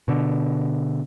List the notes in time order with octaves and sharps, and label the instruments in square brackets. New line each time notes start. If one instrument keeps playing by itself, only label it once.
[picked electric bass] B2 D3